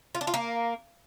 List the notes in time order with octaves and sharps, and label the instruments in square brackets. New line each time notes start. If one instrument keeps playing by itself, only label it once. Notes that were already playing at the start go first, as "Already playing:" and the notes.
[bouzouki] F4
D4
F4
A#3